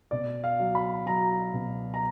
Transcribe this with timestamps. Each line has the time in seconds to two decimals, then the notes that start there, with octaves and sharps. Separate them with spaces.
0.11 B2 D5
0.44 F5
0.60 F#3
0.75 B5
1.06 F#3 A#5
1.53 B2
1.94 A#5